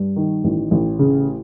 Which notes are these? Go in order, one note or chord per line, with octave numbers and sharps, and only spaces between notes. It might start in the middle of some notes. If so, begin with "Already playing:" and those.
Already playing: G2
D#3
A1
A1
C#3